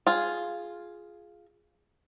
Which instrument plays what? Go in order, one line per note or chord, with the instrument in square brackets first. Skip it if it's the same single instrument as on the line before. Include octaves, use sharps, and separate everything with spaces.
[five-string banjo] F4 G#4